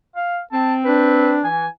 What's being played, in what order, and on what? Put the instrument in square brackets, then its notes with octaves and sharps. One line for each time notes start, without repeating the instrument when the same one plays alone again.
[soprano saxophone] F5
[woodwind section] C4 [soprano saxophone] A5
[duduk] D4 [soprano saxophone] B4
[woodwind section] E3 [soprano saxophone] G#5